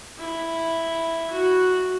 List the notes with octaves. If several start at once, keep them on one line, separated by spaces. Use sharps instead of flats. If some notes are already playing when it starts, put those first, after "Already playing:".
E4
F#4